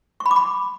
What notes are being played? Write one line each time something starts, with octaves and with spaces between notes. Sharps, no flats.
C#6
B5
D6
B5